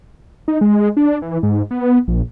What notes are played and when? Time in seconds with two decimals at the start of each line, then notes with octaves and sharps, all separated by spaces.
0.48 D#4
0.61 G#3
0.97 D4
1.22 E3
1.43 G#2
1.71 B3
2.08 A#1